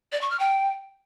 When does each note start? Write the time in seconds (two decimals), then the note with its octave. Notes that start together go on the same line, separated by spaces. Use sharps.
0.12 D5
0.21 C#6
0.30 F6
0.40 G5